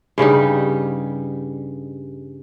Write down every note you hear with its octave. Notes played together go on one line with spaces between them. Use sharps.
G2 C#3 G3 D#4